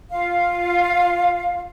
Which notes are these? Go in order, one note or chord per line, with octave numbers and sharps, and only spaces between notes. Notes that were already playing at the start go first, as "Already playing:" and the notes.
F4 F5